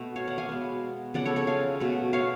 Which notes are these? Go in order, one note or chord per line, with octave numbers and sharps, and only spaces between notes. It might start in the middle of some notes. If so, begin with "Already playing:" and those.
Already playing: B2 A3
C#5 F5
D5 F#5
F5 G#5
B2 G#3 B3
C#3 F3 B3 D5 F#5
A4 C#5
A4 C#5
F5 G#5
B2 A3
C#5 F5